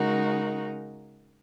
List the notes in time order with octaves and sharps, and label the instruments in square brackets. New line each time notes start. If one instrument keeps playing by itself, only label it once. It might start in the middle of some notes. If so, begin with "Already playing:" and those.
Already playing: [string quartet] C#3 G#3 D#4 F#4 A#4